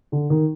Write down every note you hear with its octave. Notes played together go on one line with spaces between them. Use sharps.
D3
D#3